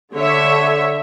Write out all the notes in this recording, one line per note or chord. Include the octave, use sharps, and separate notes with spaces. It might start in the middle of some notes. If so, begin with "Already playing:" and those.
D3 C#5 E5